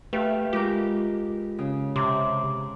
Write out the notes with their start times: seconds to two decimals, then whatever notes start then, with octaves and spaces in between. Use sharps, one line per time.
0.13 A3 G4 B4 F5
0.53 G#3 F4 G4 A#4
1.58 C#3
1.96 C3 A#5 C6 D6